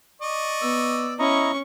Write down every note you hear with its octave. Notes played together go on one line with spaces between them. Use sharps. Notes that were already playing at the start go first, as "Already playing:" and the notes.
D5 D#5 C#6
B3 E6
C#4 E4 D#5 A#5 C#6